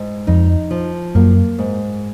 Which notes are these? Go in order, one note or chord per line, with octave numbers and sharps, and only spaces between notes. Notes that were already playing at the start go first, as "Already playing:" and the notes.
Already playing: G#2
F2 D#4
F3
F#2 A#3
G#2